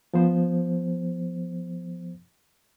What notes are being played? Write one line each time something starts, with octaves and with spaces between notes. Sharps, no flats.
F3 B3 C5